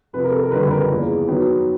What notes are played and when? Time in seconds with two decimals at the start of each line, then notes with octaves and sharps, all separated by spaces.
0.13 F2 C3 F3 B4
0.24 A#4
0.32 A4
0.43 A#4
0.51 F#1 F2 D3 G3 B4
0.66 B4
0.71 A#4
0.91 E2 C#3 F3 A#3
1.28 F#2 D#3 F#3 B3